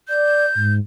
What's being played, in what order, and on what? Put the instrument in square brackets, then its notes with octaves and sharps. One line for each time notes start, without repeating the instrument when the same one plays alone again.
[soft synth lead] D5 [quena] G6
[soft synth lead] G#2